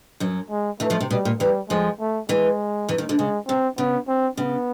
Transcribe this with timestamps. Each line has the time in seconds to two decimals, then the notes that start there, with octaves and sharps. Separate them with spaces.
0.20 F#2 F#3
0.50 G#3
0.80 E2 E3 A3
0.90 F2 F3
1.01 C3
1.10 B2 G3
1.25 A#2
1.40 E2 E3 G3
1.70 F2 F3 G#3
2.00 A3
2.29 E2 E3 G#3
2.89 E2 E3
2.98 D#2 D#3
3.09 D2 D3
3.18 C#3 G#3
3.48 C3 C4
3.78 C#3 B3
4.08 C4
4.37 C#3 B3